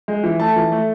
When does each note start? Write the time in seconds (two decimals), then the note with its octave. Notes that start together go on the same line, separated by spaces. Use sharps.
0.08 G#3
0.24 E3
0.40 A3 A5
0.56 E3
0.72 A3